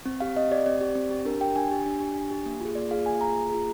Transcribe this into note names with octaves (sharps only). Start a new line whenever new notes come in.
C4
G4 F5
C4 D#5
G4 D5
C4 D5
G4
C4
G4
D4 A#4
G4 G5
D4 G#5
G4
D4
G4
D4
G4
A#3
F4 G#4
A#3 D5
F4 G#4 F5
A#3 G#5
F4 G#4 A#5
A#3
F4 G#4